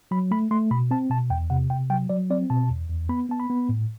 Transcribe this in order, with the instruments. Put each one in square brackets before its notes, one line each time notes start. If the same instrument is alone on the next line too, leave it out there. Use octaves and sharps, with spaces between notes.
[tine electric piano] F#3 B5
A3 B5
A3 C6
B2 B5
C4 A5
B2 A5
E2 G5
C3 F#5
C3 G5
F#3 G5
F#3 D5
C4 D5
B2 A5
E2
E2
B3 B5
B3 A5
B5
B3
A2